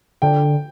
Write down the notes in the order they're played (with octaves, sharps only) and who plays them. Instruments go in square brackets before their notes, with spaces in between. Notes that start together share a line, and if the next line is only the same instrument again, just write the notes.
[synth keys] D3 [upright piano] G5